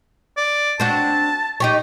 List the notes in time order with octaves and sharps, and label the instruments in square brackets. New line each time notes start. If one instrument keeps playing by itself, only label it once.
[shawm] D5
[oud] C4 D4 F#4 [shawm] A5
[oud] D#4 G4 C#5